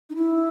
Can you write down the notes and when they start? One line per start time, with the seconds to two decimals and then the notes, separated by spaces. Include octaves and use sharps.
0.10 D#4
0.15 E4